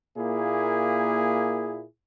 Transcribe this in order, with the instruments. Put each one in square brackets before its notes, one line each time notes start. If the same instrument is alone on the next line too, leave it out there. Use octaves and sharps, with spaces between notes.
[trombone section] A#2 A#3 E4 G#4